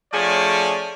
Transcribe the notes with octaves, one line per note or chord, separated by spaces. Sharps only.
F3 A3 C#4 G#4 C#5 D5